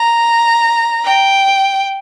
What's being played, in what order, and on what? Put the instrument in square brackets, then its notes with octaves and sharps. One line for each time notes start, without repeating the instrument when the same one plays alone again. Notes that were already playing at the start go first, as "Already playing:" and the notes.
Already playing: [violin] A#5
G5